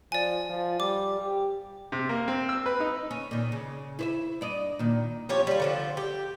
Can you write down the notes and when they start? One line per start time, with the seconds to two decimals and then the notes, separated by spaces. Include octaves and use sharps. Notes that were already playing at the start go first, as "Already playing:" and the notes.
0.12 F3 D5 G#5
0.50 F3
0.80 G3 D6
1.19 G4
1.92 C3
2.09 A#3
2.28 C4
2.49 E6
2.66 B4
2.80 D#4
3.11 C#4
3.31 A#2 D#3
3.52 C#3
3.99 E4 C5 E5
4.41 G2 D5 D#5
4.79 A#2 D#3
5.29 F3 C#4 G4 C#5
5.47 G3 F4
5.60 D3 F3 C4
5.97 G4